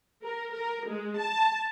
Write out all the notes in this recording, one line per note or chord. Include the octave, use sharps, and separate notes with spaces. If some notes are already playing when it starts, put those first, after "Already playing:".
A#4
A#4
G#3
A5